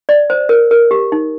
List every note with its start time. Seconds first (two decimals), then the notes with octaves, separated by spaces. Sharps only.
0.09 D5
0.30 C5
0.49 A#4
0.71 A#4
0.91 G4
1.12 D#4